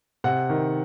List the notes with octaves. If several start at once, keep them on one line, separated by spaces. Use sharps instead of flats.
C3 F#5
D#3